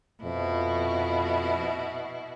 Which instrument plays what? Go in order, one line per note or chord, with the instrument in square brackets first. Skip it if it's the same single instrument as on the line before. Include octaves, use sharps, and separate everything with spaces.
[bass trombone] F2 [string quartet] B2 E4